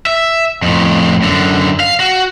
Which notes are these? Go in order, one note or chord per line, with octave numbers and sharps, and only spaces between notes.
E5
F2 A2
F#2 D3
F5
F#4